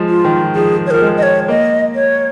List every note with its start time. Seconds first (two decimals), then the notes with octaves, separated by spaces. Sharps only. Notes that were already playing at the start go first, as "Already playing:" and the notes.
Already playing: F3 G#3
0.09 F4
0.25 D#3
0.55 F3 G#4
0.86 C#5
0.91 F3 A#4
1.02 G#3
1.18 D#5
1.23 C#5
1.48 A#3 D#5
1.95 C#5